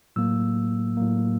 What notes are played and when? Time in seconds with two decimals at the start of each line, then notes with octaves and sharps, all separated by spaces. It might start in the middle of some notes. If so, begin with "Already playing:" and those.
0.16 A2 F#3 A#3 E6
0.97 A2 F#3 A#3